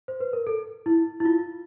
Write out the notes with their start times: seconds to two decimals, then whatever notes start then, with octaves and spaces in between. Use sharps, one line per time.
0.08 C5
0.20 B4
0.33 A#4
0.47 A4
0.86 E4
1.20 E4
1.25 F4